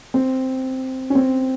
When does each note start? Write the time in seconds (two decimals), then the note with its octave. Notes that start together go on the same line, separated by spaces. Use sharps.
0.14 C4
1.10 C#4
1.15 C4